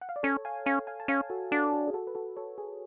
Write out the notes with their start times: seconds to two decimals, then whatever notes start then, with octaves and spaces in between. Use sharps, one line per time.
0.01 F#5
0.09 F5
0.16 D5
0.23 C#4 A4 C#5
0.45 F5 G#5
0.66 C#4 F5 G#5
0.87 F5 G#5
1.00 A5
1.08 C#4 F5 G#5
1.30 F#4 A4
1.51 D4 F#4 A4
1.73 F#4
1.87 G#4
1.94 F#4 A4
2.07 B4
2.15 F#4 A4
2.37 A4 C#5
2.58 G#4